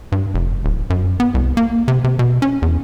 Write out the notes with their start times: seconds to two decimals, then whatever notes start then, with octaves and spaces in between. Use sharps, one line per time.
0.12 G2
0.34 F1
0.64 D1
0.90 F#2
1.20 B3
1.34 C2
1.57 A#3
1.88 C3
2.04 C3
2.19 B2
2.42 C#4
2.62 E2